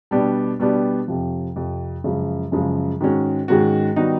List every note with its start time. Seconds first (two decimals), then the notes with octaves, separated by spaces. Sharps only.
0.11 B2 G3 B3 D4 G4
0.59 B2 G3 B3 D4 G4
1.08 F2 C3 F3
1.56 F2 C3 F3
2.04 F#2 C#3 F3 G#3
2.52 F#2 C#3 F3 G#3
3.00 G#2 D#3 G#3 C#4 F#4
3.48 G#2 D#3 G#3 C#4 F#4
3.96 D#3 G3 B3 D#4 F#4